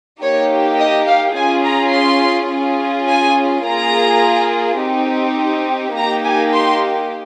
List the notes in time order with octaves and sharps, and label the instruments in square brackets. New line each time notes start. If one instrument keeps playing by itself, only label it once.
[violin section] A#3 D#4 G4 C#5
D#5
F5
C#4 F4 G#4 G#5
A#5
C6
C#4 F4 G#4
G#5
A#3 F4 G#4 A#5
C4 D#4 G4
A#3 D#4 G4 A#5
G#5
C6